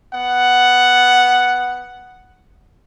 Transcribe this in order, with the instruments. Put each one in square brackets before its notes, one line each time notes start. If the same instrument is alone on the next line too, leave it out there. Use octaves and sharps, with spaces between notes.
[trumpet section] B3 F#5